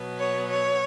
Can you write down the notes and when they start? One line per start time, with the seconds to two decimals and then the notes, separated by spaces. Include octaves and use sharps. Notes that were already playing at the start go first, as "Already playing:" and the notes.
Already playing: B2 F#3 B3
0.18 C#5
0.51 C#5